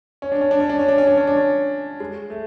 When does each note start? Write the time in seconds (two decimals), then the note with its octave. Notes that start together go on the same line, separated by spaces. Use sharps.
0.22 C#4
0.32 D4
0.41 C#4
0.51 D4
0.60 C#4
0.70 D4
0.79 C#4
0.88 D4
0.98 C#4
1.07 D4
1.17 C#4
1.27 D4
1.37 C#4
2.00 G#3
2.30 A3